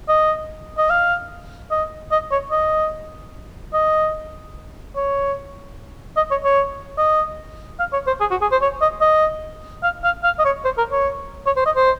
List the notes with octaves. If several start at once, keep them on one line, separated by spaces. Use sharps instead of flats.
D#5
D#5
F5
D#5
D#5
C#5
D#5
D#5
C#5
D#5
C#5
C#5
D#5
F5
C#5
C5
G#4
F#4
G#4
C5
C#5
D#5
D#5
F5
F5
F5
D#5
C#5
C5
A#4
C#5
C#5
C5
D#5
C5